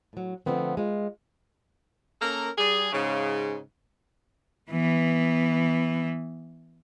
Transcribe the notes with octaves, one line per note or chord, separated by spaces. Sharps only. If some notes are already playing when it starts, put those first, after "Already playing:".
A2 F#3
D3 F3 G#3 A3 B3 C4
G#3 F4
A#3 C#4 A4 A#4
G3 G#4
G#2 C#3
E3 B3